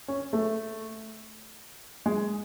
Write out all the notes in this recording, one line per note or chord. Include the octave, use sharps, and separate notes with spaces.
C#4
A3
G#3